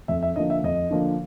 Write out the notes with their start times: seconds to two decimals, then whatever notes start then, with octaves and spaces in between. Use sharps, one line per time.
0.08 F2 E5
0.23 E5
0.36 D3 F3 A#3 D#5
0.50 E5
0.64 F2 D#5
0.91 D3 F3 A#3